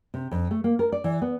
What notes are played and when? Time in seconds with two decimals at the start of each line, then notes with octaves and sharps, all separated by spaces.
0.14 C3
0.31 F2
0.51 A3
0.64 A#3
0.79 A#4
0.92 D5
1.04 E3
1.22 B3